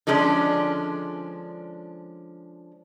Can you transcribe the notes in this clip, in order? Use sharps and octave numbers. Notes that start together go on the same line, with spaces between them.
D3 F3 G#3 C#4 D4